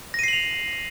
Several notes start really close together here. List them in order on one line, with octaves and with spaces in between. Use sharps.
A#6 D#7 C7 F#7 F7